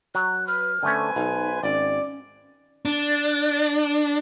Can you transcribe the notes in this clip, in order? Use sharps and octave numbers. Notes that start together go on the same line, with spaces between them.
F#3 F#6
B4 F6
D3 A3 C#4 B4 C5 G#5
B1 D#4
G#1 C#4 D5
D4